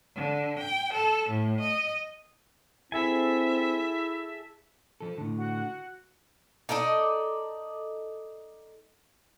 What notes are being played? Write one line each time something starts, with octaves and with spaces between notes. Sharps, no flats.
D3
G5
A4
A2
D#5
C4 E4 G#4 A4 E5 G#5
F3 A4
A2 D3
F#4 F#5
D#4 A4 D5 D#5